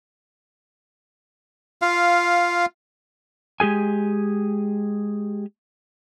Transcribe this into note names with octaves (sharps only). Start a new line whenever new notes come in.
F4 F5
G#3 G4 G#4 G#5